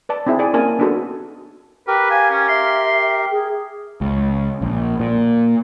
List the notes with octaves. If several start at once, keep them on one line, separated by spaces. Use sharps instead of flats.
B4 D5 A5
C4 D#4 E4 G#4 E5
G#4 D5 G#5
A#3 C#4 A#4 G#5 A5
B3 D4 D#4 F#4 G#4 A4
G4 A#4 B4
F5 G#5
C#4
E5 C6
G#4
C#2
A#1
A#2